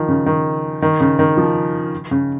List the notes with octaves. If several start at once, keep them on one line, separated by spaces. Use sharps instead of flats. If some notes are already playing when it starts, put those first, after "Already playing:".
Already playing: D#3 F3
C#3
D#3
D#3
C#3
D#3
F3
C#3